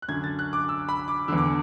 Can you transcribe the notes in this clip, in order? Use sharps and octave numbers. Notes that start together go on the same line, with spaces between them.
F#6
F#2 D3 G#6
A6
F#6
D6
E6
B5
D6
E2 D3 E6
D6